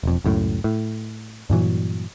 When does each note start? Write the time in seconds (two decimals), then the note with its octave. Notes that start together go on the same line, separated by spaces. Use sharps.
0.03 E1 F2
0.24 C#2 F#2 A2
0.64 A2
1.50 G2 A#2 E3 F#3